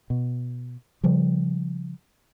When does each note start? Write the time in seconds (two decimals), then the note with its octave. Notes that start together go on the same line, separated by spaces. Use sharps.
0.10 B2
1.03 C#3 F3 G3